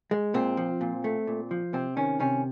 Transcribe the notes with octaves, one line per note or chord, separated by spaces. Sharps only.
G#3
A#2 C4
F3
A#2
A3
A#2
F3
C3 C4
D#3 C#4
C3 C#4